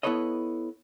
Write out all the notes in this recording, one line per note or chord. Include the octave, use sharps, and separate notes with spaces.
B3 E4 A4 B4 C#5 D#5